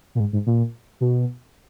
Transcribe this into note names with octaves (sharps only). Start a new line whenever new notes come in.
A#2
G#2
G#2
A#2
B2